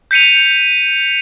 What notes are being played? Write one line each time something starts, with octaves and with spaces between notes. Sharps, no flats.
G6 B6 C#7 D#7 F7